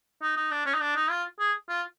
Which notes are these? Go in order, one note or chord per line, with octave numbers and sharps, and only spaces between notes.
D#4
D#4
D4
C#4
D#4
D4
D#4
F4
G#4
F4